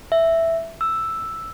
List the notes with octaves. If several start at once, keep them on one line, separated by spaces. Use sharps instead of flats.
E5
E6